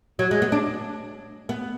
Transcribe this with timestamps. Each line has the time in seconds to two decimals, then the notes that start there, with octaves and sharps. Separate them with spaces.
0.19 F#3
0.31 G#3
0.42 B3
0.52 D4
1.49 B3